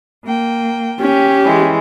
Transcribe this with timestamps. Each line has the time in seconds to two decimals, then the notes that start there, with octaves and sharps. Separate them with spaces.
0.25 A#3 G5
1.01 C#4 G4
1.43 E3 G#3